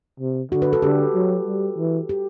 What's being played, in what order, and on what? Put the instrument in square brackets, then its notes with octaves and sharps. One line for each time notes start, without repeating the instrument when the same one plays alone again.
[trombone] C3
[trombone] D3 [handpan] F#4
[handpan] B4
A4
[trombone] D3 [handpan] G4
[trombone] F#3
G3
E3
[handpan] G4